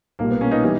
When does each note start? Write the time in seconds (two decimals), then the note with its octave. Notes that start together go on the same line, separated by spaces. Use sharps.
0.19 B1 A#2 G3 A#3
0.30 B3
0.41 A#3 C#4
0.51 B3 D#4
0.63 E3 G3